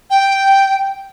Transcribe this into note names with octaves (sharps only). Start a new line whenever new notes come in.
G5